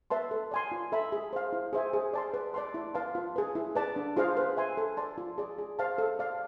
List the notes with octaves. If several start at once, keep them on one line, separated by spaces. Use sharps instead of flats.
B4 E5 A5 C6
A4
D5 G#5 C6
F4
A4 E5 B5
G#4
C5 F5
E4
G#4 C5 E5 G#5
G#4
D5 A5 C6
B4
D5 A5 C6
E4
B4 F5 A5 C6
F4
G#4 B4
E4
B4 D5 A5
D4
F4 G#4 C5 F5
B4
E5 G#5 C6
A4
D5 A5 C6
F4
G#4 D5
G#4
C5 F5 A5
A4
D5 F5